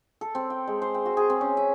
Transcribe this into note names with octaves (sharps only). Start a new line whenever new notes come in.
A4
C4
G5
G#3
C5
G5
F#4
G#4
C4
C#4
E5